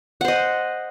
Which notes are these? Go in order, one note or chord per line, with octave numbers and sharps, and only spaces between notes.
C5 D#5 F#5